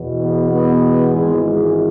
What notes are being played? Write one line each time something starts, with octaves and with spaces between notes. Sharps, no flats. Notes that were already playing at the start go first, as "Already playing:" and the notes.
Already playing: E2 B2
B3
B3
G#1 G#2 E3 G#3
G#3